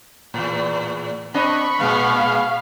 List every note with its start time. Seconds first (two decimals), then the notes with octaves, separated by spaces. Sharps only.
0.34 E2 A2
1.34 C4 D4 D#5 B5 C#6
1.79 A#2 G#3 B3 F5